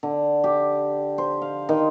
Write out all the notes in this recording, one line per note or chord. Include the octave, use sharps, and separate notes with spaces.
D3
G4
C5
F5
D#3